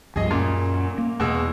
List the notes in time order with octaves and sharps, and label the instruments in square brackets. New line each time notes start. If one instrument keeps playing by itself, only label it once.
[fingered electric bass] C#2 G2 F3 [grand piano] G#4 D#5
[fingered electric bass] F#2 C#4 [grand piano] A#2
[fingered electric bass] A#3
[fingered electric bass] E2 [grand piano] B2 G#3 E6